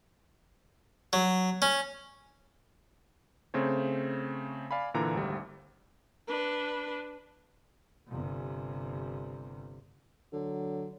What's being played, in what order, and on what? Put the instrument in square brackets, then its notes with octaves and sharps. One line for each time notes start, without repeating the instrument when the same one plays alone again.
[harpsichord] F#3
C#4
[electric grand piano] C#3 A3 C4 C5 C#5
D5 F5 G#5 B5
A#2 D3 E3 A#5
G#1 D2 G3
[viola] D4 B4
[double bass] G1 C3
[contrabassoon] D3 [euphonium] F#3